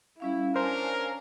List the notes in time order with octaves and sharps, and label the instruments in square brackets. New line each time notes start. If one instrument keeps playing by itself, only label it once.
[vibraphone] G3 C#4 F5 [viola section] E4
[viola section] C#4 D4 F5 [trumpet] A#4 [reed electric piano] C5 [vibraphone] G#5